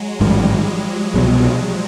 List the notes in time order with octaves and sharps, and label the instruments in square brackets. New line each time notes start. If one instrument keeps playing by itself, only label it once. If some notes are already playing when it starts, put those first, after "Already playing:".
Already playing: [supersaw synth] F#3 G#3
[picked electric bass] A1 G#2 D#3 [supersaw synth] F3 G3
[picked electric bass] C2 B2 F#3